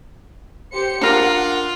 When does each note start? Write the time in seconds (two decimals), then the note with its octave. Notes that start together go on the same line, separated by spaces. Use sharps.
0.72 G4 C5 C#7
1.01 D4 F4 A#4 F#5